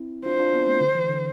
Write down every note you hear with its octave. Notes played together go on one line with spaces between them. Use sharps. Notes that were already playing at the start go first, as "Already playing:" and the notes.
Already playing: C4 E4
D4 F4 C5
D4 F4
B3 D4
A3 C4
D3
E3
D3